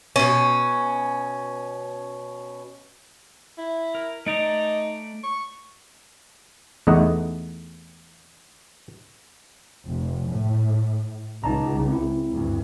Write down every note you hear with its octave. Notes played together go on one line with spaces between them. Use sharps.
B2 C#4
E4
A#4
A3 D#4 D5 A#5
C#6
E2 A3 D#4 D#5 F#5
F1
A2
C#2 D#4 A5 A#5
C4 E4
D2 G2